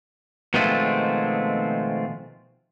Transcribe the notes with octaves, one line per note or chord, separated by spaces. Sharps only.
B2 D#3 F3 G#3 A3 C4